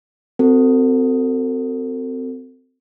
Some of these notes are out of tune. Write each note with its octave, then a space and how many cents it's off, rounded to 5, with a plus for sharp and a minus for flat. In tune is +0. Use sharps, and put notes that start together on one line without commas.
C4 -20 F#4 +0 A4 +35